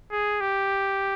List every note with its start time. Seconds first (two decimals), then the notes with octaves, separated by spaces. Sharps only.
0.11 G#4
0.41 G4